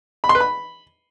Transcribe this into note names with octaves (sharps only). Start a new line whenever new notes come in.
B5
C6
B4
B5